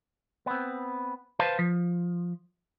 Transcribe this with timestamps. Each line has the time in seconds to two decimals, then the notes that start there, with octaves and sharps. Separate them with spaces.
0.46 B3 C4
1.39 B4 C5 F5 A5
1.59 F3